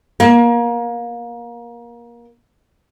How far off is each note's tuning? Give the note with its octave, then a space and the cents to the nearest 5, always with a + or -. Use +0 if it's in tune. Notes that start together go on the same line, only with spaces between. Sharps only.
A#3 +25